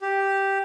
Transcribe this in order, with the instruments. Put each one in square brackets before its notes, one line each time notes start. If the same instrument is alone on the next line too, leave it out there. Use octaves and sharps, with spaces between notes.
[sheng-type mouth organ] G4